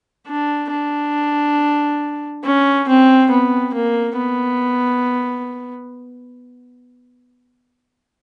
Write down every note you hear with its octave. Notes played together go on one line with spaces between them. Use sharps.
D4
D4
C#4
C4
B3
A#3
B3